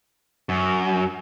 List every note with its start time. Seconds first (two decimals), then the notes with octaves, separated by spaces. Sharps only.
0.49 F#2